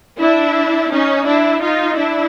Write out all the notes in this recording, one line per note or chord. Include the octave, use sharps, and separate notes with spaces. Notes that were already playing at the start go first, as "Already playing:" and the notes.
D4 E4
C#4 D#4
D4 E4
D#4 F4
D4 E4